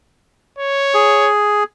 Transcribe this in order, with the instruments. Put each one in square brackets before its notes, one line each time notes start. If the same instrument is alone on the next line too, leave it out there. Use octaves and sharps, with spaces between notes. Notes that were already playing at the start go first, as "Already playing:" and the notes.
[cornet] C#5
[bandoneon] G#4